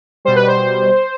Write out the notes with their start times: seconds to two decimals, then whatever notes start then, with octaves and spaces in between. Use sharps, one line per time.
0.25 B2 G3 C5
0.36 B4
0.48 C5